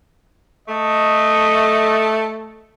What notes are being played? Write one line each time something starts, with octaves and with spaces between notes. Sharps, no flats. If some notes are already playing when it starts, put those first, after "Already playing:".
A3 D#5